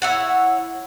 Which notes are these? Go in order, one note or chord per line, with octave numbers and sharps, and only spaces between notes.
E4 C#5 F#5